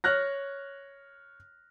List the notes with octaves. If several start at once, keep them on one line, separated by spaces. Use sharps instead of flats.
C#5 F6 F#6 A#6